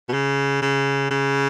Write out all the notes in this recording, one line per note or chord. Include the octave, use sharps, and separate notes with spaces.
B2
C#3
C#3
C#3